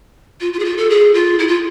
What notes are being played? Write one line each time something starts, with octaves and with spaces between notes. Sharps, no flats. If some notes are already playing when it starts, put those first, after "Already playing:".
F4
F4
G#4
F4
A4
G#4
F4
E4
F4